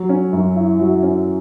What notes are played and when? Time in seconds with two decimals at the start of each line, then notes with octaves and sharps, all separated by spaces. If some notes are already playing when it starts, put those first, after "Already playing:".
Already playing: F#3
0.09 C#4
0.33 F#2
0.56 E4
0.79 F#3
1.03 C#4